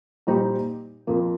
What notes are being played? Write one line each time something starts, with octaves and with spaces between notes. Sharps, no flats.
A#2 G3 D#4 G4 C5
F2 F3 A#3